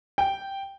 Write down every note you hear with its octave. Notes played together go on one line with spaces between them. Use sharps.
G5